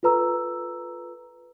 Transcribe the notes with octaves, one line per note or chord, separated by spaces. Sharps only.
F4 A4 B4 A#5 E6